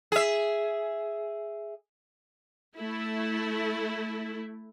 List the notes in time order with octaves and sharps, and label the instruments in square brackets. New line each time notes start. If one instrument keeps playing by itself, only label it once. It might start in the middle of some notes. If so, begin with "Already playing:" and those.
[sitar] G#4 E5
[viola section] A3 E4